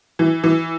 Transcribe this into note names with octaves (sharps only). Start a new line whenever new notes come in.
E3
E3